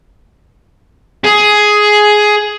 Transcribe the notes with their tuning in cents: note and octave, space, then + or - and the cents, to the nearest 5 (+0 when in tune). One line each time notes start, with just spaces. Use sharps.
G#4 +10